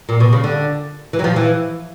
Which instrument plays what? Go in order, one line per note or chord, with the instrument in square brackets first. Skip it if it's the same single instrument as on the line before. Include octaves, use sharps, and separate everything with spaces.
[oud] A#2
B2
C#3
D3
E3
F#3
F3
E3